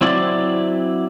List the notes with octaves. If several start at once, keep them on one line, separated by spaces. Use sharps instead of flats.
F#3 C4 E4 D5